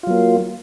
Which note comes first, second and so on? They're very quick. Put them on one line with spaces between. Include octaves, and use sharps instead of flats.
F4 F#3 A#3